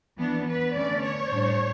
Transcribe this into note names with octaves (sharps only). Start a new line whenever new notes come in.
E3 B3 D4
B4
D3 A3 C#4 D5
C#5
A2 G3 D4